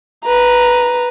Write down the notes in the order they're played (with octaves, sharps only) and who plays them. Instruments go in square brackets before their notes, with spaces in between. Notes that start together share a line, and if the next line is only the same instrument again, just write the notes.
[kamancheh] B4 A#5